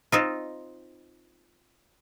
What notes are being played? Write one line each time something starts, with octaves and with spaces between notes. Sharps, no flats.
C4 D#4 F4